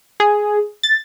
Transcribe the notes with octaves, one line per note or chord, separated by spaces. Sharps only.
G#4
A6